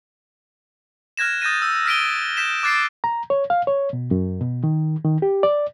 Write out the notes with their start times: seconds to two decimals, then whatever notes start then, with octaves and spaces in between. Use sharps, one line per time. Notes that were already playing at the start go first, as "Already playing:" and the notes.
1.17 F6 F#6 G#6 A#6 E7
1.41 D#6 G6 A6 A#6 D#7
1.62 E6
1.86 F6 A#6 B6 D7 D#7 G7
2.37 G6 B6 E7
2.63 D6 F#6 A6 C7 D7
3.04 A#5
3.30 C#5
3.50 F5
3.67 C#5
3.93 B2
4.11 F#2
4.40 B2
4.64 D#3
5.04 D#3
5.22 G4
5.43 D5